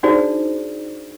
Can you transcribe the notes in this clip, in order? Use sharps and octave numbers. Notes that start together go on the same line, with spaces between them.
D4 D#4 F#4 G#4 C5 D5